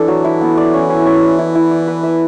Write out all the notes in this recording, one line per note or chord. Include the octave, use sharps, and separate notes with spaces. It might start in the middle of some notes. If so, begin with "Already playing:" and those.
Already playing: E3 D4 A4
F#3
E4
B3
D5
C#4
C#4
C#4
D5
E4
E4
D5
B4
E5